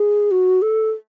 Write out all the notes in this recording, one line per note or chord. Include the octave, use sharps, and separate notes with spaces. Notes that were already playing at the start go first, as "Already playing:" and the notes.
Already playing: G#4
F#4
A4